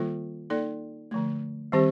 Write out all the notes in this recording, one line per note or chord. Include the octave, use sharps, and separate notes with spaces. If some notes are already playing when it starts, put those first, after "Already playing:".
Already playing: D#3 G3 A#3 F4 A4
A#3 D#4 A4 D5
D3 F3 A3
D#3 G3 C4 G4 C5